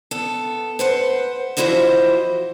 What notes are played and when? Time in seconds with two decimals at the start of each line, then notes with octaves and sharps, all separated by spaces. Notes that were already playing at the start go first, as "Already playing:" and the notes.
0.11 B3 A4
0.79 B4 C5 F#5
1.57 E3 F3 E4 F#4 C5 D#5